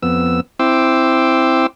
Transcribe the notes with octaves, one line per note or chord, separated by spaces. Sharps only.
F2 B3 E6
C4 E4 G5 C6 D6 E6